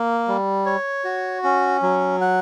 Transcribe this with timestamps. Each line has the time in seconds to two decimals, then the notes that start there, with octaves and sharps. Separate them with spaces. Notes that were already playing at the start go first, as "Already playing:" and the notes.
Already playing: A#3
0.28 G3
0.66 C#5
1.05 F#4
1.44 C#4
1.82 F#3
2.21 F#5